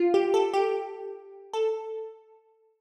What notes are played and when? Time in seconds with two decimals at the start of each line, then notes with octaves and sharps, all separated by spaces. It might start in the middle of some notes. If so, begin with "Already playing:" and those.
Already playing: F4
0.14 G4
0.34 A4
0.54 G4
1.53 A4